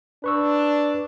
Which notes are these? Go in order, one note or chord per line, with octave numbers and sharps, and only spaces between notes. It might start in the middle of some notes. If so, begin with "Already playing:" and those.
D4 B4 C#6 E6